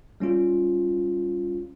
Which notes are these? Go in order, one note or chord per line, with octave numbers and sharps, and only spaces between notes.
G3 C#4 F4